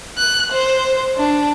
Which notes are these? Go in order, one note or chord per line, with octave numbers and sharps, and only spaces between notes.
F#6
C5
D4